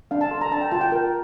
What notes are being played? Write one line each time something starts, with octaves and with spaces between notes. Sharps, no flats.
D4 F5
A5
A4 C6
A#5
D4 A5
G5
F4 A5
G5
A#4